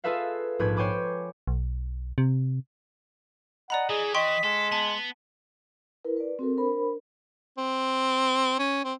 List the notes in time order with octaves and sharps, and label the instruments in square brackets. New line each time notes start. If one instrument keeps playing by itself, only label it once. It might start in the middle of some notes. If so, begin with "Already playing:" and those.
[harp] F4 G#4 A4 B4 E5 F5
A#1 G#2 F3 B4 G#6
C5 C#5 G5 G#5 B5 D6
[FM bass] B1
C3
[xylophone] D5 A#5 B5 [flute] D#5 [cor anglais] F#5
[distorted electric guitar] E3 [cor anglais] G#4
[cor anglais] D#5 [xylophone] G5 C6 C#6 [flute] B6
[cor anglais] G#3 [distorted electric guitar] A4
[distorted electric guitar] B3 [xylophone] A5
[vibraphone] E4 A#4 B4
B4 D5
C4 F#4 A4 A#4
D4 A#4 C5 B5
[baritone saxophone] C4
C#4
C4